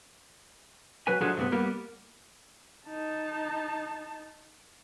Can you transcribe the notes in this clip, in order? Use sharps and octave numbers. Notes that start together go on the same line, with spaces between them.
F#3 B4 G#5
F3 F#3 G#3 D4 G#4 A4
G2 C3 B3
G3 A#3 B3
D#4 A5